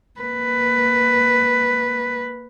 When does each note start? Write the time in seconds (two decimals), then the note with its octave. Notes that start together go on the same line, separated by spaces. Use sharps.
0.20 A#3 B4